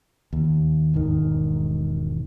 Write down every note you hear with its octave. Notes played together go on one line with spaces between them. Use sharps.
D#2
E1 G#2 D#3